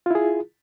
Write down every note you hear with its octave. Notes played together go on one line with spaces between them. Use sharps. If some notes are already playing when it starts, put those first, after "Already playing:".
E4 F4 G#4